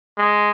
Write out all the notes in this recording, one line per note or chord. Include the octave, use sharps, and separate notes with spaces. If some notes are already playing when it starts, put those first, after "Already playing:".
G#3